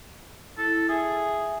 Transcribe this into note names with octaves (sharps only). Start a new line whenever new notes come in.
E4 A4
G#4 E5 G#5